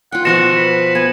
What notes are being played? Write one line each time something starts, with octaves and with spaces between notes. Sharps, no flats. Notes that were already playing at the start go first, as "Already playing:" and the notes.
F4 F#5 G5
B2 F3 F#4 C6 A#6 C#7 E7
B4
B3 G#5